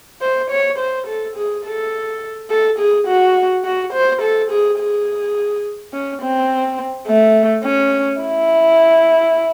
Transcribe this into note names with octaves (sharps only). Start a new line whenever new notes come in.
C5
C#5
C5
A4
G#4
A4
A4
G#4
F#4
F#4
C5
A4
G#4
G#4
C#4
C4
A3
C#4
E4